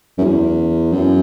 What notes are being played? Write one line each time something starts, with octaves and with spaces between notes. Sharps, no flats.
F#2
E2
F#2